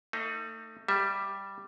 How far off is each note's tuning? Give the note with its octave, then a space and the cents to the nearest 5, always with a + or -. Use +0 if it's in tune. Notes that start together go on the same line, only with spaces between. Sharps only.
A3 +35 D#4 +10
G3 +0 E5 +0